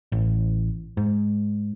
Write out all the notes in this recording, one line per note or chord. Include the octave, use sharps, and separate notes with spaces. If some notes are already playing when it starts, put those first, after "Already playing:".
A1
G#2